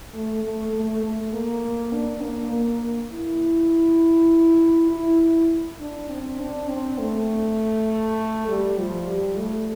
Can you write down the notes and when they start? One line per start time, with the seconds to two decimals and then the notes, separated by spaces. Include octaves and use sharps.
0.14 A3
0.44 A3
0.73 A3
1.03 A3
1.33 A#3
1.93 D4
2.22 A#3
2.52 A#3
3.12 E4
4.91 E4
5.80 D4
6.10 C4
6.40 D4
6.69 C4
6.99 A3
8.48 G3
8.78 F3
9.07 G3
9.37 A3